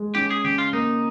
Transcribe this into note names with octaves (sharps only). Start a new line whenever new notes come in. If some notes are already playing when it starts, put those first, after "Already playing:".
Already playing: G#3
C#4 G4
G#4
C#3 G4
F4
A#3 D#4